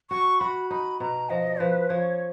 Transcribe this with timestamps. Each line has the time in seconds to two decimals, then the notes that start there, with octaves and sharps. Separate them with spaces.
0.10 F#4 C#6
0.40 F#4 B5
0.70 D#4 B5
1.00 B2 A#5
1.30 F3 D#5
1.60 F3 B4
1.89 F3 C#5